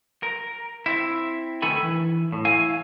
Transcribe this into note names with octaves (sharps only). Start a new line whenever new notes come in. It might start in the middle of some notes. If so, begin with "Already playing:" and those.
A#4
C4 E4
D2 D#3 A4 G#5 B5
E3
A2
E4 F5 G#5